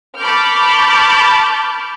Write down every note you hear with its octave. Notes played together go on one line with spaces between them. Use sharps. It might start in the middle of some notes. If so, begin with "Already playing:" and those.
A5 B5 C#6 D6 F6 G6